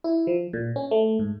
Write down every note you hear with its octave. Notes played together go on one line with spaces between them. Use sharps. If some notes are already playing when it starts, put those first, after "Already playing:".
E4
F3
A#2
C#4
A3
G#2